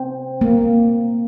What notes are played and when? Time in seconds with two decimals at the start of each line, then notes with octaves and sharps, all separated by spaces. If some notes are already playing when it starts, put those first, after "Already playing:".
Already playing: C4
0.41 A#3